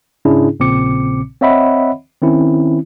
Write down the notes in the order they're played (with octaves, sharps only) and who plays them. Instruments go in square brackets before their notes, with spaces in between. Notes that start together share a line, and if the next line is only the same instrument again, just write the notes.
[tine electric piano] G#2 C#3 C#4 D4 E4 G#4
A#1 A#2 C#3 C4 D6 C#7
C4 C#5 D#5 E5 F#5 B5
D#3 C4 C#4 E4